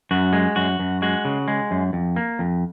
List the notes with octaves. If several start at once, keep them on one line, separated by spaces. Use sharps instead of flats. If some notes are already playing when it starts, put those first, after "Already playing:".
F#2 F#4
G#3
F#2 F#4
F#2
G#3 F#4
C#3
G#3
F#2
F2
A#3
F2